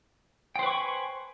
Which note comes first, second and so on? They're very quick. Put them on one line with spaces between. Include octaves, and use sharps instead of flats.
G5 C5 B4 C#6 G#5